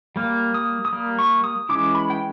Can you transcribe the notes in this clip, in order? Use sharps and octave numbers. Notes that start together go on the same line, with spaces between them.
G3 A#3
D#6
D#6
G3 A#3
C#6
D#6
E3 G#3 C#4 E4 D6
B5
G5